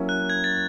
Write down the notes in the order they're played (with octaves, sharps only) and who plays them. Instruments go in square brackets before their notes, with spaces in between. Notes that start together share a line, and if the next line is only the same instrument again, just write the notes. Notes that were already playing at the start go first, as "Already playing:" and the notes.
Already playing: [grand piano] F#3 A#3 C#4 E4
[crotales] F#6
G#6
A6